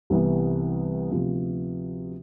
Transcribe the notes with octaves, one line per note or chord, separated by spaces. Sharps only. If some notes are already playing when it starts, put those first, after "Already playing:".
C2 C3 E3 B3
D2 C3 F3 B3 F4